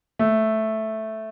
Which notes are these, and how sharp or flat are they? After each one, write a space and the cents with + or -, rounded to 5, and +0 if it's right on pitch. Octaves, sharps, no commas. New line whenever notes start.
A3 -5